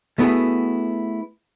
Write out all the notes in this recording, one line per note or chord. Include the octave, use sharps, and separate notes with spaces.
G3 A3 B3 E4 F#4 G#4